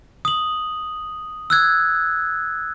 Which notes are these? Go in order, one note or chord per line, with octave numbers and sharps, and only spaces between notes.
D#6 F#7
E6 F#6 G#6